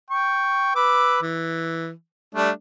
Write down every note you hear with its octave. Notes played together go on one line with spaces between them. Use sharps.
G5 C#6
B4 D6 E6
E3
G3 A3 D4